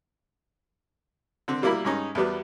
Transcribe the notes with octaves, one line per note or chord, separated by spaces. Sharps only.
D3 C4
B2 G3 A#3 E4 A#4 B5
G2 G#3 C#4 D#4
E2 F#3 G3 B3